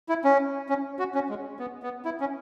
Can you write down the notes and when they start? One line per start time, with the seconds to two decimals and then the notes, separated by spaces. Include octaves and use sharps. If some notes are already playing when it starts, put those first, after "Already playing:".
0.09 E4
0.24 C#4
0.69 C#4
0.99 F#4
1.15 C#4
1.29 G#3
1.59 B3
1.83 B3
2.05 E4
2.20 C#4